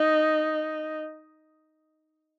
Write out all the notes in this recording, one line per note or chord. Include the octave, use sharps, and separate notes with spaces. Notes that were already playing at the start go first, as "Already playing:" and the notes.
Already playing: D#4